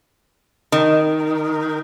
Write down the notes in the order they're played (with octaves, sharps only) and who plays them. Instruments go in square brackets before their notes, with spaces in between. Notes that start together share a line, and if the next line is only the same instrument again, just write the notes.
[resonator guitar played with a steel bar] D#3